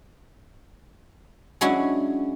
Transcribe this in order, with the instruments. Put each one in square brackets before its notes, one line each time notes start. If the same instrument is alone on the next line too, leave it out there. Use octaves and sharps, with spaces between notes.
[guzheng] F#3 G#3 C#4 D4 E4 F#4